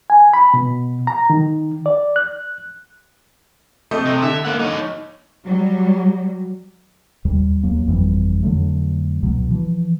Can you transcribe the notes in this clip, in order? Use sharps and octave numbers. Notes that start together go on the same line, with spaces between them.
G#5
B5
B2
A#5
D#3
D5
F#6
A3 C4 D#5
C3
D3 E5
A#3 F#5
D#4 C#5
F#3 G3
D#2 G3
D#2 F#3 A#3
G1 F2 E3 G3
F2 D3 F#3 A3
C#2 B2 F#3
E3 F3